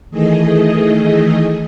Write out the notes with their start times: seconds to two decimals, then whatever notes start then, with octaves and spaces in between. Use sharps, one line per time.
0.11 D#3 E3 A3 G#4 D#5